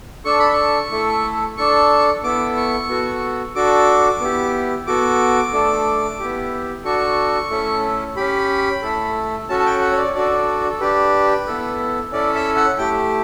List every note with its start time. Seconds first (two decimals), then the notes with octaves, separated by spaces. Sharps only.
0.25 D4 A4 C#6
0.39 B5
0.53 C#6
0.91 A3 E4 A4
1.57 D4 A4 C#6
2.23 B3 E4 A4 D6
2.56 C#6
2.89 B3 F#4 A4
3.55 D4 F#4 A4 D6
4.20 B3 E4 G4
4.87 B3 F#4 A4 D6
5.53 A3 D4 A4
6.19 B3 E4 G4
6.85 D4 F#4 A4 C#6
7.50 A3 C#4 E4 A4
8.16 C#4 G4 B5
8.82 A3 E4 A4
9.49 C#4 F#4 A4 A5
9.59 A5
9.66 G5
9.81 F#5
9.92 C#5
9.98 D5
10.15 D4 F#4 A4 D5
10.70 A4
10.80 D4 G4 B4
11.47 B3 E4 A4
12.12 C#4 E4 A4 D5
12.35 E5
12.56 F#5
12.78 A3 E4 G4 G5